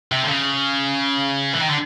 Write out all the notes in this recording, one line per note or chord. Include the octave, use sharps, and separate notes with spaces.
C3
D3
C#3
E3
D#3
D3